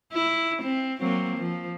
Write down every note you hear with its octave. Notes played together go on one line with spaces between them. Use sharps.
E4
C4
F#3 A#3 C4
F3